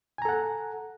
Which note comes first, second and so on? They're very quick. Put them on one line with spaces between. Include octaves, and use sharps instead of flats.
G#5 A#5 A4 F#5